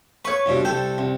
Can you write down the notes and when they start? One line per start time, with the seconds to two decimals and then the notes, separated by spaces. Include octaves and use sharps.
0.25 B4 C#5 C#6
0.46 C2 G2 B2
0.65 C2 A4 G5
0.98 C2